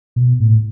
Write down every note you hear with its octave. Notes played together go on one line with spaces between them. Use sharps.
B2
A2